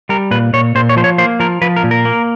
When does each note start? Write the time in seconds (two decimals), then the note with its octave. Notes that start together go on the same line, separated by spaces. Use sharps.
0.09 G3 A#4
0.31 A#2 B4
0.53 A#2 C#5
0.75 A#2 C5
0.89 C#5
0.96 F3 C5
1.04 C#5
1.18 A#3 C5
1.40 F3 A#4
1.62 F3 B4
1.76 A#4
1.84 A#2
1.91 A#4
2.05 A#3